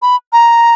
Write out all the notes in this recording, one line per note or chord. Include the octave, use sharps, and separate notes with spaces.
B5
A#5